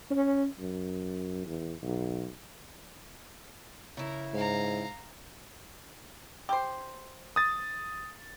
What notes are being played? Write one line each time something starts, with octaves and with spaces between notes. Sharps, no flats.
C#4
F#2
E2
B1
C#3 E4 A#4 A#5
G#2 F5 A#5
G4 C5
D#6 A6